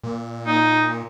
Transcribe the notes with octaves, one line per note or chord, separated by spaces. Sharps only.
A#2
D#4